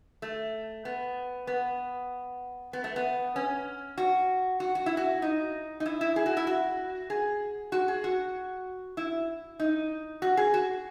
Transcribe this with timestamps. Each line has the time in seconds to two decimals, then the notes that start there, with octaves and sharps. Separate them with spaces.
0.22 A3
0.85 B3
1.47 B3
2.73 B3
2.84 A3
2.96 B3
3.36 C#4
3.98 F#4
4.60 F#4
4.75 F#4
4.86 E4
4.97 F#4
5.22 D#4
5.80 D#4
5.86 E4
6.01 E4
6.16 G#4
6.26 F#4
6.37 E4
6.47 F#4
7.10 G#4
7.72 F#4
7.88 G#4
8.04 F#4
8.97 E4
9.60 D#4
10.22 F#4
10.37 G#4
10.54 F#4